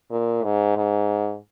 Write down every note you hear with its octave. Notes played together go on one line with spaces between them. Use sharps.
A#2
G#2
G#2